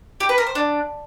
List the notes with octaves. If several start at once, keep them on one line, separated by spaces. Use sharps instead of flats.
G4
B4
A#4
C5
D4